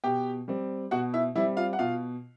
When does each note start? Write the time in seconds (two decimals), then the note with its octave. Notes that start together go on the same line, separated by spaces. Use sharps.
0.04 B2 G4 G5
0.48 G3 C4
0.91 B2 F#4 F#5
1.13 E4 E5
1.35 G3 C4 E4 E5
1.57 F4 F5
1.73 F#5
1.79 B2 F4 F5